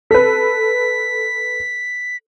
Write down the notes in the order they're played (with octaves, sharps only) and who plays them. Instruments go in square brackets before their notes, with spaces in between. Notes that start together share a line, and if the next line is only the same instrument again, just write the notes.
[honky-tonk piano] A4 B4 [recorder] B6